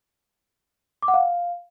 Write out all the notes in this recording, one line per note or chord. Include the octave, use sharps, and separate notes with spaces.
D6
F#5
F5